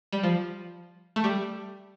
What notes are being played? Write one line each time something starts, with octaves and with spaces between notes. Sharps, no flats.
G3
F3
A3
G3